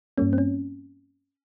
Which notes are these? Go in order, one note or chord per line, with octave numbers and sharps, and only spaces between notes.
G2 G3 A#3 C#4
C4
C#4